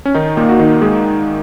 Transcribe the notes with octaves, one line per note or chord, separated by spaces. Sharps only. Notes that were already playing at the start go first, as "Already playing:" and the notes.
C#4
D#3 D#4
A#2 A#3
F#4
D#3 D#4
G#3 G#4